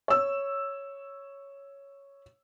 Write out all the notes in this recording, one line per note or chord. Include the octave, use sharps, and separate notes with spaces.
C#5 E6